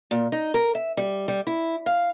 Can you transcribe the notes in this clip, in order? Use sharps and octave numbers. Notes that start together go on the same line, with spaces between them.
A#2
D#4
A#4
E5
G3
G3
E4
F5